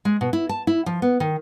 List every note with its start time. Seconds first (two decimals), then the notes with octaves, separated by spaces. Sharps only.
0.05 G#3
0.21 B2
0.33 E4
0.49 A5
0.67 E4
0.86 F3
1.02 B3
1.20 D#3